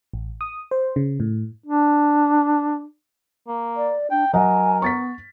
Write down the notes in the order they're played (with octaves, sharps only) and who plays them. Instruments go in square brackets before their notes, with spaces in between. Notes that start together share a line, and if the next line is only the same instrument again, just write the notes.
[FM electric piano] A1
D#6
C5
C#3
A2
[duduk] D4
[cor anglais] A#3
[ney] D5
[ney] D4 [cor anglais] G5
[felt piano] F#3 D#5 F#5 [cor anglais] A#4 [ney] G#5
[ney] B3 [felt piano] C#6 A6 B6